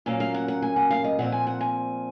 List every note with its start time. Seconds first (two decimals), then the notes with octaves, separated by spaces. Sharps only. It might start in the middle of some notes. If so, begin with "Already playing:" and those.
0.06 A#2 F#3 A#3 C#4 F5
0.20 F5
0.34 F#5
0.48 F#5
0.62 G#5
0.76 F#5
0.90 F5
1.04 D#5
1.19 A#2 F3 C4 F#5
1.32 G#5
1.47 F#5
1.61 G#5